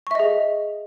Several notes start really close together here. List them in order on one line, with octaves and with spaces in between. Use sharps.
C#6 E5 D#5 G#4